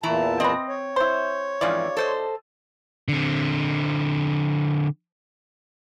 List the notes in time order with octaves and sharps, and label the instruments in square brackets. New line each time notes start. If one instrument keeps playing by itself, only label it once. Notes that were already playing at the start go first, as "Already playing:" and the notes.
[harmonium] E2 A#2 A5 [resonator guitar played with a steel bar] E3 E4 A#5
[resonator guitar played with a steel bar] C4 [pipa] B4 D#5
[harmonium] C#5
[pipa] E4 C5
[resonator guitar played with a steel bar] F2 G#2 E3 [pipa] C#3 F4 D5
[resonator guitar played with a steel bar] A4 C5 D#5
[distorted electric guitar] D3 C4